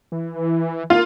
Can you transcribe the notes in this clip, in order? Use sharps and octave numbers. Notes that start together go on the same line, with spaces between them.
E3
A#3 F4